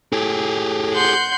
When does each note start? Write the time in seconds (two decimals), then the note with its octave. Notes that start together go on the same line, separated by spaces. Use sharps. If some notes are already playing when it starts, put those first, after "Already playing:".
0.12 A2 G4 G#4
0.94 F#5 C6 G6